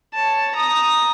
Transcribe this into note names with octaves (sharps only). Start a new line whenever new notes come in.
C#5 A5
A#5 D#6